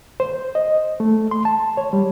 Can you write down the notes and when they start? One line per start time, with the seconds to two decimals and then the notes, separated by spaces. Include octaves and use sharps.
0.20 C5
0.55 D#5
1.00 A3
1.31 C6
1.45 A5
1.77 C#5
1.93 G3